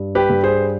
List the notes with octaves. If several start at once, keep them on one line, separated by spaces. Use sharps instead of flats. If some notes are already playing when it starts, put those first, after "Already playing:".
Already playing: G2
G4 B4
G2
G#4 C5